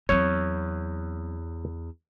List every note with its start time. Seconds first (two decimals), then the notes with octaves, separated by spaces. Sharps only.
0.09 E2 F#3 C4 C#5